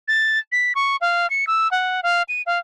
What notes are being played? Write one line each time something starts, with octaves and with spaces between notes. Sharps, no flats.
A6
B6
C#6
F5
C#7
E6
F#5
F5
D#7
F5